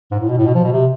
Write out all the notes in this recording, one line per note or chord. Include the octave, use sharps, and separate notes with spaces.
G#2
A2
B2
A2
B2
F3
B2
C3